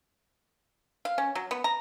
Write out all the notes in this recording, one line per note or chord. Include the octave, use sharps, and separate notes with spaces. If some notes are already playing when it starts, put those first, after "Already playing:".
F5
C#4
F#3
B3
A#5